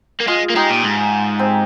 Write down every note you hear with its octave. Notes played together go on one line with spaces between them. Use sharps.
A#3
G#3 F4 G#4
A#3
G#3 D#4 G4
A#2
G#2
C4